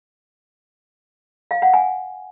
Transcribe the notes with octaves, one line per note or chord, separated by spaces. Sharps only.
F5
F#5
G#5